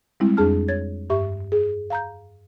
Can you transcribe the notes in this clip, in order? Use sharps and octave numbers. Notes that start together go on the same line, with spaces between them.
G3 G#3 C4 E4
F2 D4 G#4 A5 F6
C#5 G#6 A6
G2 G4 E5 C#6
G#4
F5 A#5 G6